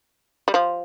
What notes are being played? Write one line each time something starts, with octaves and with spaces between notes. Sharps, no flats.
G3
F3